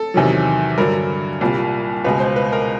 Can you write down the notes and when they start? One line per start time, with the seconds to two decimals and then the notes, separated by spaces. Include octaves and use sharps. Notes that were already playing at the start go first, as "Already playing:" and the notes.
Already playing: A4
0.14 E2 C3 D#3 F#3
0.78 G2 D3 F#3 A#4
1.41 C2 A#2 G3
2.04 C#2 B2 G#3 B4
2.20 C5
2.36 B4
2.52 A#4